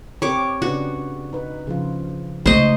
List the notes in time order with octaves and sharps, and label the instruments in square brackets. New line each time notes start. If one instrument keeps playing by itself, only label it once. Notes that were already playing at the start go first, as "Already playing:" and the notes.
[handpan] C4 G4 A#4 [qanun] C#5 D6
[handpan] C#3 D4 B4 [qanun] F#4
[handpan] D#4 B4
C#3 F3 F4
[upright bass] C#3 A3 [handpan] G#3 D#4 C#5 [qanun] C5 D#5